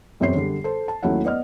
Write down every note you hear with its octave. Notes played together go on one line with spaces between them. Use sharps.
E1 F#2 F#3 C4 C#5 C7
D3 G3
A4 C5
A5
D#2 F#3 A3 C#4 E4 F#5
B3 D5 D#5 F6